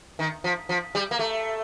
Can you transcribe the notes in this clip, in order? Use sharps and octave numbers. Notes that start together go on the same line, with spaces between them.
D#3
F3
F3
G3
A#3
A3